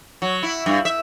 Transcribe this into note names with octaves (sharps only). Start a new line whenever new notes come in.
F#3
E4
G2
E5